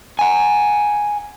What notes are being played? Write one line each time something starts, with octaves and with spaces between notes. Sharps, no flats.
F#5 G#5